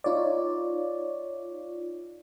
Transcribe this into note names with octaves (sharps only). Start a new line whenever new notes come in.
D#4 F4 C#5 D5